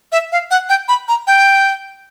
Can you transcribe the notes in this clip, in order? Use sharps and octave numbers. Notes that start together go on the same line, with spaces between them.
E5
F5
F#5
G5
B5
A#5
G5